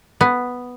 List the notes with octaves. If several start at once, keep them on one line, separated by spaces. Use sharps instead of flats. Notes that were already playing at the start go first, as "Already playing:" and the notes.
B3